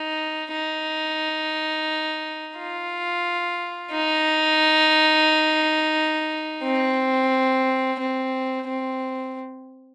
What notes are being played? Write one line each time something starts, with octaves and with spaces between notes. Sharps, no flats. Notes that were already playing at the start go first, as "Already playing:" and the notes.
Already playing: D#4
D#4
F4
D#4
C4
C4
C4